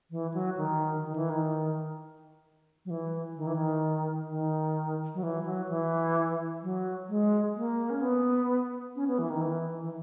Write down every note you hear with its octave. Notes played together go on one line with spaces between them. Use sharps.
E3
F#3
D#3
D#3
E3
D#3
F#3
E3
D#3
E3
D#3
D#3
F#3
E3
F#3
E3
F#3
G#3
A#3
C#4
B3
C#4
B3
E3
D#3
E3
E3